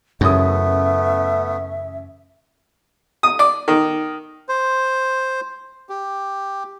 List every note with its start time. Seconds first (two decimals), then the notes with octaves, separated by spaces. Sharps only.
0.21 A1 F#2 C#3 A3 B3 E5 D#6
3.23 D#6
3.39 D5
3.68 D#3
4.49 C5
5.89 G4